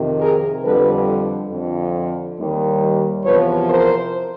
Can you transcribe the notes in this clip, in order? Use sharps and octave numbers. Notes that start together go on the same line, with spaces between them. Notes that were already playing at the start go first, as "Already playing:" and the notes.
Already playing: F2 C3 D#3
G#4 A#4
F2 D3 G3 A4 B4
F2 D3 F3
D#2 D#3 G3
E2 C3 F3 B4 C#5
A#4 C5